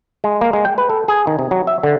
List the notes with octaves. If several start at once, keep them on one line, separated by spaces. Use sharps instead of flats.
G#3
A#3
G#3
G5
B4
A4
G#4
D#3
C3
F#3
E5
D3